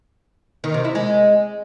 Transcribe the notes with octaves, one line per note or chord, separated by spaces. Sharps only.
D#3
C3
E4
G#3